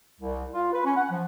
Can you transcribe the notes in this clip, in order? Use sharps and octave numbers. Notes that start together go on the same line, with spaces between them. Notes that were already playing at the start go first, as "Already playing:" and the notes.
C2
F4
B4
C#4
F#5
F3